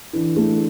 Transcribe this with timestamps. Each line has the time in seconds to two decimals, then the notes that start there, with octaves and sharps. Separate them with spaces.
0.13 D3 E3
0.36 A3